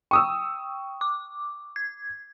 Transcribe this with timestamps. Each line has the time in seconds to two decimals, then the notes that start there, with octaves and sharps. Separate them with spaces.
0.11 G5 C#6 D#6 E6
1.01 D6
1.76 G#6